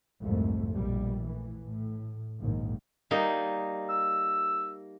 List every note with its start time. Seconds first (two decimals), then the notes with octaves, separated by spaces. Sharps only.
0.22 C2 F2 G#2 C3 A3
0.73 A#1 B2 G3
1.22 A2 E3
1.65 A2
2.40 A#1 D#2 G#2 D#3
3.11 G3 A#3 D#4
3.90 E6